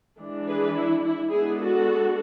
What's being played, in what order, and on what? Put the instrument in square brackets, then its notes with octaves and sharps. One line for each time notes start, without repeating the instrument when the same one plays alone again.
[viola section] E3 G#3 D4
G#4 B4
E4
E4
G#3 B3 D4 E4 G#4
F#4 A4